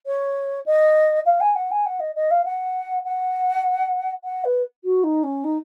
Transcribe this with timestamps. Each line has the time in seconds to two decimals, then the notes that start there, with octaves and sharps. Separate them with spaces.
0.06 C#5
0.66 D#5
1.26 F5
1.40 G#5
1.55 F#5
1.71 G#5
1.86 F#5
2.00 D#5
2.15 D#5
2.31 F5
2.45 F#5
3.05 F#5
4.24 F#5
4.44 B4
4.84 F#4
5.04 D#4
5.23 C#4
5.44 D#4